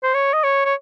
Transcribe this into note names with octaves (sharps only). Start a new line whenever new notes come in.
C5
C#5
D#5
C#5
C#5